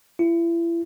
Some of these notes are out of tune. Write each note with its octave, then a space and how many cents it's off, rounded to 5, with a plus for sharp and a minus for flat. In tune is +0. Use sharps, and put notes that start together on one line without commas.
E4 +35